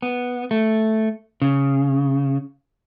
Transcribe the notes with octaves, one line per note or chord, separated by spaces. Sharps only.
B3
A3
C#3